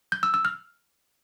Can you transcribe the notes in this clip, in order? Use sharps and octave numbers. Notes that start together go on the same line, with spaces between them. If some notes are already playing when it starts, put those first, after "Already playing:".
G6
E6
E6
F6